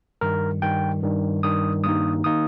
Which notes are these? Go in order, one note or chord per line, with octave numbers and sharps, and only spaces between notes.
G2 D#3 G3 A#4
G2 D#3 G3 G5
G2 D#3 G3
G2 D#3 G3 D#6
G2 D#3 A#3 D#4 D#6
D#3 A#3 D#4 D#6